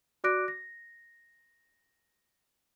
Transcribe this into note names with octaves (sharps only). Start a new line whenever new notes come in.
F#4 D5 D6 F#6 A#6 D7
A#6